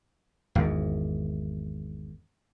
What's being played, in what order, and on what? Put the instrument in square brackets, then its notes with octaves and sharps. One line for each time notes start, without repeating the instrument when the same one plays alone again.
[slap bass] G#1 E2